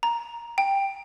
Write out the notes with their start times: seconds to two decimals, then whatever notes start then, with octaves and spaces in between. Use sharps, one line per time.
0.03 A#5
0.58 G5